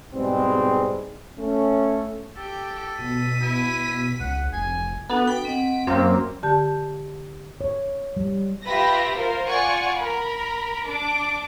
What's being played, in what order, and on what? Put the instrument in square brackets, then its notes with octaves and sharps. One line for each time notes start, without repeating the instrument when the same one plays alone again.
[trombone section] G#2 B2 G3 G#3 C4
A3 C#4
[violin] G4 [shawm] A4
[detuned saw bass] B2 [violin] B6 D#7
[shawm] E4
[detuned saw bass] C#2 [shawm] F#5
[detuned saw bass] F1 [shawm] G#5
[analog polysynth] B3 [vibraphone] D4 F#4 A4
[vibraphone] G5 [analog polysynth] B6 D7
[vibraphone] C4 D#5 F#5
[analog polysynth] F#2 A#3 C4 [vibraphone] C#4
[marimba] D3 G4 A5 G6
[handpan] C#5
G3
[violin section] F4 G4 B4 E5 B5 A#6
F4 A#4 C5
F4 D5 F#5 G#5 C#6
A#4 B5
D4 D6